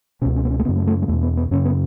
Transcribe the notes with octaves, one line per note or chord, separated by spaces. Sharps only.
C#2 B2 C#4
C#4
B3
C#4
A3
F#2 C#3 B3
A3
A3
G#3
E2 B2 A3
B3
B3
F#2 C#3 C#4
B3